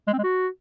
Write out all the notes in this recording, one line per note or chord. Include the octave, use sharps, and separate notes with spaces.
G#3
C4
G#3
F#4